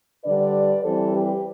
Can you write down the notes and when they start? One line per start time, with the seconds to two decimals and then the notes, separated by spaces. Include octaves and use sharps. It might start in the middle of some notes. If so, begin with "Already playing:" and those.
0.25 D3 G3 D4 B4 D5
0.84 E3 G3 C4 A4 C5
1.13 G4 B4